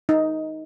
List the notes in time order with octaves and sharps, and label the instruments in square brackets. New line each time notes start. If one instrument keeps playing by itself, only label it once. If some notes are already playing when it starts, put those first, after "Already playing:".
[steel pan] D#4